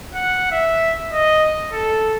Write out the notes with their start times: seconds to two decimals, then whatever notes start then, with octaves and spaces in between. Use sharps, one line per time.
0.15 F#5
0.51 E5
1.12 D#5
1.72 A4